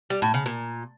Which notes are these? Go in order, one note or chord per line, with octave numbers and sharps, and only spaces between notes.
G3
A2
C#3
A#2